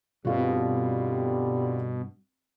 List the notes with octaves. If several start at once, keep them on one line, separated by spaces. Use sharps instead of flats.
G2 B2 D3 G3 C4 F4 F#4